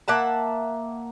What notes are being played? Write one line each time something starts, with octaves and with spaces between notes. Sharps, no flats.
A#3 E5 F#5 A5